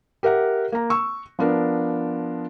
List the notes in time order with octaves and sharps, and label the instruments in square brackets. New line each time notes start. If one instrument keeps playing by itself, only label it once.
[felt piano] G4 A#4 E5 F#5
A#3 A#5
C#6 E6
F3 B3 D4 A#4